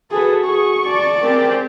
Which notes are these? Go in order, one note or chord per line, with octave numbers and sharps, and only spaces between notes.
F#4 G#4 A4 B4
G#4 C#6
D5 A5
C4 G4 G#4 A#4